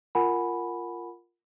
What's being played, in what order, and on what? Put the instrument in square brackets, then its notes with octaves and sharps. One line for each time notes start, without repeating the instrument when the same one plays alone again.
[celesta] F4 A#4 F#5 G#5 B5